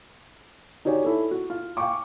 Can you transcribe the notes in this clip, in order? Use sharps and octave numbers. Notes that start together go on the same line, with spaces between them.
D#4 F#4 G4 C#5 D5 G#5
E4 A4
F#4
F4
F5 G5 G#5 C#6 D6